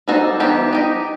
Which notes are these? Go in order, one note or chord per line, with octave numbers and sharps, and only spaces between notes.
G3 D#4 F#4 A4 C5
E3 B3 D#4 G4 C5
D#4 G4 D#5